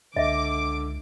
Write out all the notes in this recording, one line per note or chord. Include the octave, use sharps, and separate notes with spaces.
C#2 D3 D#5 E5 D6